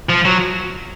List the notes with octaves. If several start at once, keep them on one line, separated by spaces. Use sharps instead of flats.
F3
F#3